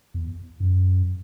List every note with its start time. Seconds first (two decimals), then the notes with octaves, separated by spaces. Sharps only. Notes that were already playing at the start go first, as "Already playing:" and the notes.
0.14 E2
0.60 F#2